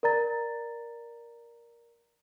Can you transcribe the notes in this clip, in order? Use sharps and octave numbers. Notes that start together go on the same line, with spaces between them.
A#4 D5 A#5 A6